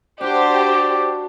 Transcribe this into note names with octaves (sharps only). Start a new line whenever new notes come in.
D4 F#4 G4 C5 D5